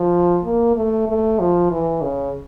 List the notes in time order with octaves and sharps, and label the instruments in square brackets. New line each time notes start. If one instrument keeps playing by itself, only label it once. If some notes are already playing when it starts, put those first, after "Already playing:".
Already playing: [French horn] F3
A#3
A3
A3
F3
E3
C#3